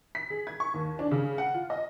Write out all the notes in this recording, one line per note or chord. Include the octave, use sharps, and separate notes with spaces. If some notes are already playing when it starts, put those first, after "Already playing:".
B6
G#4
G#6
C#6
D#2
D4
C#3
F#5
F4
D#5